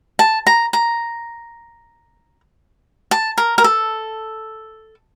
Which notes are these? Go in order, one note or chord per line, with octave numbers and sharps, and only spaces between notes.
A5
A#5
A#5
A5
A#4
A#4
A4